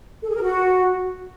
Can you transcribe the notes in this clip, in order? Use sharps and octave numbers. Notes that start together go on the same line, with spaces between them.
A4
G#4
A#4
F#4